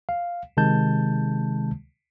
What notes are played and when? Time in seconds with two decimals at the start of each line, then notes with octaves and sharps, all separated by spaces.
0.09 F5
0.57 C3 D#3 G#3 A5 G6